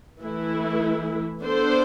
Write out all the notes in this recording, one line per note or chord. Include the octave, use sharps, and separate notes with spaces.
E3 A3 E4
B3 D4 A4 C5